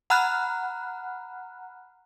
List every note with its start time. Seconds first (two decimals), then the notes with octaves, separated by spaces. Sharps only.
0.10 F#5 A#5 B5 F6 F#6